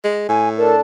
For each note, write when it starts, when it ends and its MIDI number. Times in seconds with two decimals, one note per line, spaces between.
0.04 0.25 56
0.29 0.80 45
0.29 0.49 80
0.57 0.81 62
0.57 0.81 69
0.57 0.74 70